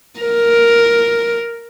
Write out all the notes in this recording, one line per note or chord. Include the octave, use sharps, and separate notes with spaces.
A#4